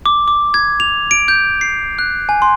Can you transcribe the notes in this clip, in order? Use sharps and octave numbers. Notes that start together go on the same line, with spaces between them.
D6
D6
G#6
F7
D7
G6
C7
F#6
G#5
C6